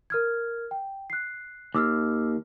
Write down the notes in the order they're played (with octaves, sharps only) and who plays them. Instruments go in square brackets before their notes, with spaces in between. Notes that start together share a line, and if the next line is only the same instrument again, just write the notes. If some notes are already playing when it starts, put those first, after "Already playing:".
[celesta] A#4 F6 G#6
G5
F#6 C7
[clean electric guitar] D#2 [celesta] D6 E6 F6